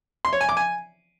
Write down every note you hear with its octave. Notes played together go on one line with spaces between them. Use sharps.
C6
C#5
G#5
D6
G#5